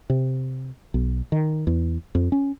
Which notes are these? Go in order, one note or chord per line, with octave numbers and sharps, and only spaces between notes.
C3
B1
D#3
E2
F2
C#4